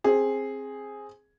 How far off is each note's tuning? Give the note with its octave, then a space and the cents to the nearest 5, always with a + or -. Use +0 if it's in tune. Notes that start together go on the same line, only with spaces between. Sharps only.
C4 +20 G#4 +0